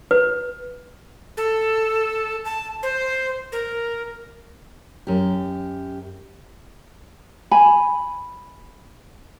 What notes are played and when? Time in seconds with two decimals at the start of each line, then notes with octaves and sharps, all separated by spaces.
0.11 B4
1.37 A4
2.45 A5
2.83 C5
3.52 A#4
5.07 F#2 G4
7.51 G#5 B5